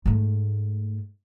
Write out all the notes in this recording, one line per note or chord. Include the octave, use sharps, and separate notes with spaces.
G#2 A3